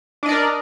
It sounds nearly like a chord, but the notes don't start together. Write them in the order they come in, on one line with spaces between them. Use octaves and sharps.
D4 D#5 D5 A#4